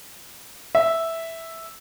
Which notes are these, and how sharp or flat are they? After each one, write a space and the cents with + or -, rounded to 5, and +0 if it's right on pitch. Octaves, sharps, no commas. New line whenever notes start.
E5 -5